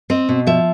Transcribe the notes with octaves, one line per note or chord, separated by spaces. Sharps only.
C4 D#5
B2
F3 E5